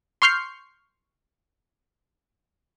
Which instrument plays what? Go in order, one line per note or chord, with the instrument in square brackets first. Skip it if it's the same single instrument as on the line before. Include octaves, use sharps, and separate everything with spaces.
[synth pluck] C6 C#6 F6 G6 C7